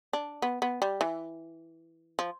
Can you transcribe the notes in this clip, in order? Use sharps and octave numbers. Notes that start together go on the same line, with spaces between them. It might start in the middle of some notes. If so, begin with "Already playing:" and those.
D4
B3
B3
G3
E3
F3